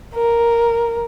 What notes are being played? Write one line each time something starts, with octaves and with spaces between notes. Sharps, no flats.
A#4